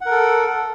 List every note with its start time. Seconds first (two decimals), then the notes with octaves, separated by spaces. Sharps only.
0.01 F#5
0.06 A#4
0.11 A4